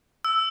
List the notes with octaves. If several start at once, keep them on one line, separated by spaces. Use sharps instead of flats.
E6